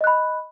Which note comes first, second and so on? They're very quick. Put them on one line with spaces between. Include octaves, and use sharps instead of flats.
D#5 F#6 B5